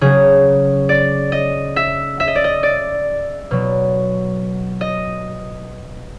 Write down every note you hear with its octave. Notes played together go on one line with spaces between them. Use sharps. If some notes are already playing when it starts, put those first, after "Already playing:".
C#3 F#3 G#4
D5
D#5
E5
E5
D#5
D5
D#5
D5
B2 F#3
D#5